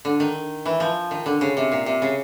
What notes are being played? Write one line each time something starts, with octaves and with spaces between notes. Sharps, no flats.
D3
D#3
E3
F3
D#3
D3
C#3
C3
A#2
C3
C#3